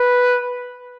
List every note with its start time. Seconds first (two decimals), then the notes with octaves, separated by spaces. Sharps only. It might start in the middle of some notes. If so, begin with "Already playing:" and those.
Already playing: B4